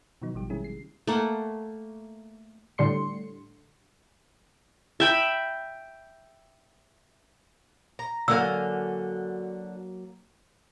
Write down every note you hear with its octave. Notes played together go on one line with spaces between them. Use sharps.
B2 D#3 F3 F#3 B3 D#4
A1 F3 G3 G4
C3 D#3 G#3 C#4 E4 G#4
C7
A3 A#3 F#5
A2 D3 G3 C6 C#7
E5 G5 B5
A#5
D3 F#3 A#3 F#4 F5 G#5 E6